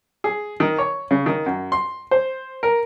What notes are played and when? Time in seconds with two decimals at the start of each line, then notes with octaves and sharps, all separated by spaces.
0.24 G#4
0.60 D#3
0.78 C#5
1.11 C#3
1.26 D#3
1.46 F#2
1.72 C6
2.11 C5
2.63 A#4